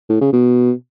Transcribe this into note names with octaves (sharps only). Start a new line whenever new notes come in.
A2
C#3
B2